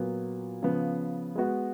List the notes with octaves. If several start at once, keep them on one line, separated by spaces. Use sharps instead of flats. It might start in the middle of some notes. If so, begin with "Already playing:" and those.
Already playing: A#2 F#3 B3
C#3 F3 B3
G#3 B3 F#4